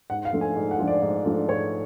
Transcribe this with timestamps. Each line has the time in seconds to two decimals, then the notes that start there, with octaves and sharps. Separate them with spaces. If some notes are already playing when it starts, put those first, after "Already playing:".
0.10 G#2 F#5
0.25 F5
0.33 F3 A3 D4 F4
0.41 G#5
0.56 G#2
0.71 F#5
0.79 F3 A3 D4 F4
0.88 D5
1.02 G#2
1.25 F3 A3 D4 F4
1.49 G#2 C#5